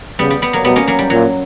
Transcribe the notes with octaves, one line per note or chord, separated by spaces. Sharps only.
C#3 G3 B3
G3
G3 B3
F#3 A#3
B2 G3 B3
A#3 C#4
F#3 A#3
G3
A#2 F#3